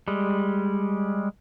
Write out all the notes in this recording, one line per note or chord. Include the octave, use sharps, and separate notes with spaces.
G3 G#3